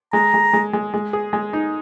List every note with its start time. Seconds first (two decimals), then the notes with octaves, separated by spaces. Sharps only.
0.13 G#3 A#5
0.34 G#3
0.53 G#3
0.73 G#3
0.94 G#3
1.13 G#4
1.33 G#3
1.53 D#4